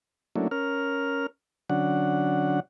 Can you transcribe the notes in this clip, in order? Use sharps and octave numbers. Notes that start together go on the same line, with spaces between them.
F#3 A3 A#3 C#4 D4 E4
C#4 A#4 F6
D3 F#3 C#4 D4 F#5